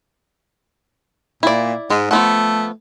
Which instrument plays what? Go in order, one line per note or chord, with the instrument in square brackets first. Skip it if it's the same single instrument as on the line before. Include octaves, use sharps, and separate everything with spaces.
[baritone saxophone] A#2 [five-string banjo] E4 D5
[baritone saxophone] G#2 [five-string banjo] G#3
[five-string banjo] F3 B3 F#5 [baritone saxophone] A3